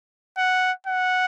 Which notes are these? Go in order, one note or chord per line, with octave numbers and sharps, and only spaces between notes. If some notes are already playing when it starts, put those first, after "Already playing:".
F#5
F#5